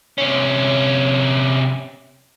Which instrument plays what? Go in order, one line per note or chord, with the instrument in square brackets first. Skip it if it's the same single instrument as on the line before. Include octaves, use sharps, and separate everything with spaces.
[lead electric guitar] C3 C#4